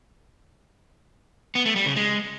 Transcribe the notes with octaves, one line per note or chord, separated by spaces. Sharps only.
B3
A3
G3
C#3
G#3